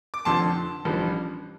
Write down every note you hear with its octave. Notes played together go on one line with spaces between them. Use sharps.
D6
F1 F2 D3 F3 A5 C6
A1 G2 F3